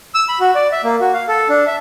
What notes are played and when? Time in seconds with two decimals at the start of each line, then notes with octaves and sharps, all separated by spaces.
0.14 E6
0.29 B5
0.40 F#4
0.55 D5
0.72 E5
0.84 A#3
1.00 F#4
1.14 F5
1.28 A4
1.49 D4
1.67 E5